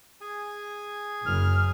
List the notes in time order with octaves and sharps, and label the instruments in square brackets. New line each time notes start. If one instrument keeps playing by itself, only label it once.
[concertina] G#4 G#5
[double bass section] F#1 F#2 C#3 [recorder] F6